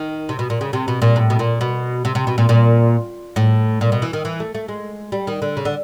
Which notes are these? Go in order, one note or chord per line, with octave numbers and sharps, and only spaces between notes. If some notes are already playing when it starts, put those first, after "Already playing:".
Already playing: D#3
C3
B2
A#2
C#3
C3
B2
A#2
A2
B2
A#2
B2
C3
C3
B2
A#2
A#2
A2
A#2
B2
E3
D#3
E3
A3
A3
G#3
G3
D#3
D3
C#3
D3